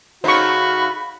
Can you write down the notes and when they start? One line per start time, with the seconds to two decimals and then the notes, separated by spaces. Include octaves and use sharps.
0.24 C#3 A3 D#4 F#4 C5 B5 C#6